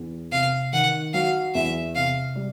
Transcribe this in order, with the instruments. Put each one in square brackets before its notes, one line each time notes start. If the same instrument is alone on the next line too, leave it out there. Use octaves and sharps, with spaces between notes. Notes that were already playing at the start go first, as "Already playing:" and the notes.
Already playing: [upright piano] E2
[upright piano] C3 [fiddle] F5
[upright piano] D#3 [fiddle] F#5
[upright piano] F#3 [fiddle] F5
[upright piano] E2 [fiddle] E5
[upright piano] C3 [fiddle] F5
[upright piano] G3